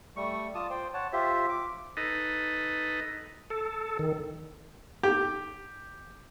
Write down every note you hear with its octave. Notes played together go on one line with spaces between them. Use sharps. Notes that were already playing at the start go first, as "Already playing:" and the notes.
G3 A3 C#6
F4 D5 A5 D#6
C5 G5
C#5 F#5 A5
F4 G4 C5 E5
D6
D#4 A4 B4 D#5
A4
D#3
G4